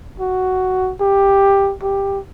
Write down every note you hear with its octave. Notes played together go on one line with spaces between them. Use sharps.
F#4
G4
G4